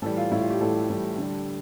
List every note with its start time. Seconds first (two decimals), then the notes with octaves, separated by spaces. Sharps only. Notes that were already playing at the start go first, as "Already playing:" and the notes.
0.02 A2 E3 G3 A4
0.17 F4
0.32 A2 E3 G3 E4
0.41 F4
0.50 G4
0.60 A2 E3 G3 A4
0.89 A2 E3 G3
1.18 D3 G3